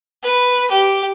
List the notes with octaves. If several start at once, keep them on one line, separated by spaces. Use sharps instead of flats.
B4
G4